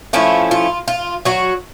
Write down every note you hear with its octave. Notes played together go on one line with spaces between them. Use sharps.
F3 A3 C#4 E4 F4
F4
F4
F#3 F#4